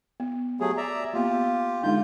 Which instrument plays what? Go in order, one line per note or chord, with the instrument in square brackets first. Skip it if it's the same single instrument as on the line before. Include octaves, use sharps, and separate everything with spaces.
[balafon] B3
[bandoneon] F#3 A3 G#4 [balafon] G4
[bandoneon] D5 E5 A#5
[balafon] A#3 B3 [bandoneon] F4 G4
[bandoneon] D3 F4 G6 [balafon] G#3 D4 D#4